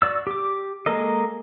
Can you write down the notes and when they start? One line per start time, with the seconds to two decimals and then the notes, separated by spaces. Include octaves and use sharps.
0.02 F#4 D5 E6
0.27 G4 D6
0.86 G#3 A#3 A4 A#4 D#5